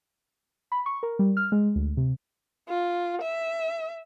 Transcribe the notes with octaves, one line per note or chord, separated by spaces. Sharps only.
B5
C#6
A#4
G3
F6
G#3
D2
C3
F4
E5